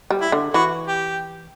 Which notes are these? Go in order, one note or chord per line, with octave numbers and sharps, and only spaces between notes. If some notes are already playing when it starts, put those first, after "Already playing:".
G3
E4
D3
E3 F#4
G4